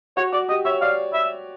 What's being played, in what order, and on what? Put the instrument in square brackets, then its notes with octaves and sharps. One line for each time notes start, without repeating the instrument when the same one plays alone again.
[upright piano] F#4 [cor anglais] C#5
[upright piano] F#4 [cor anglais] D5
[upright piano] G4 [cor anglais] D#5
[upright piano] C#5 [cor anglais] E5
[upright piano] D5 [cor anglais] F5
[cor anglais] E5